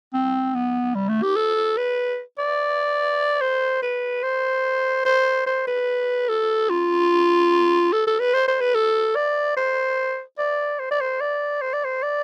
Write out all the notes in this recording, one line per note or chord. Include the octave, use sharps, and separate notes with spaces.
C4
B3
G3
A3
G4
A4
B4
D5
C5
B4
C5
C5
C5
B4
A4
F4
A4
A4
B4
C5
C5
B4
A4
D5
C5
D5
C5
D5
C5
D5
C5
D5
C5
D5